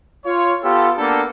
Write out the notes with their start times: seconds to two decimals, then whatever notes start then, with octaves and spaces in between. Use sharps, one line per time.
0.25 F4 C#5
0.62 B3 F4 G4 A4
0.98 A#3 B3 D4 G4 A4